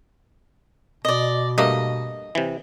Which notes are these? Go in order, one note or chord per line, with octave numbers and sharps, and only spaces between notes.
B2 D5 D#5
G2 A3 A#3 D#5
C3 E3